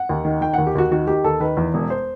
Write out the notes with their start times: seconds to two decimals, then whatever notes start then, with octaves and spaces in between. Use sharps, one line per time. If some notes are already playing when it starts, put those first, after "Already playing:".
Already playing: F#5
0.09 D#2
0.25 D#3
0.41 D#3 G5
0.54 D#2 F#5
0.67 G4
0.75 D#2 F#4
0.91 D#3 F#4
1.07 D#3 G4
1.24 D#2 A4
1.40 D#3 B4
1.57 E2
1.74 E1
1.90 C5